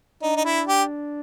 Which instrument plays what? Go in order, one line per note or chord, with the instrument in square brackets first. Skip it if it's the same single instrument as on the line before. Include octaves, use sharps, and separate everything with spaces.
[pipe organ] D4 [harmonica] D#4
[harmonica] D#4
E4
G4